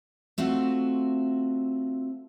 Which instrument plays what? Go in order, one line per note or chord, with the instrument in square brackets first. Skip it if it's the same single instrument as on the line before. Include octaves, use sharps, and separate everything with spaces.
[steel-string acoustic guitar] A3 C4 F4 F#4